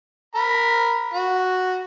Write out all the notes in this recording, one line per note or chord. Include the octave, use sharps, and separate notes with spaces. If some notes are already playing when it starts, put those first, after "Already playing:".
A#4 B5
F#4